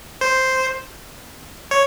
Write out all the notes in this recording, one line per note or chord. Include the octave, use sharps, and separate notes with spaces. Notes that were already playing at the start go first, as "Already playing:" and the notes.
C5
C#5